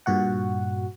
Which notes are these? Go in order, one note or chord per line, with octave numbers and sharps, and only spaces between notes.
G2 A#2 F#4 F#5